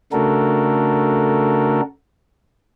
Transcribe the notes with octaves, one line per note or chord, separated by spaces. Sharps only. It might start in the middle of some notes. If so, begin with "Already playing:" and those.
C#3 A3 D4 F#4 A4 A#4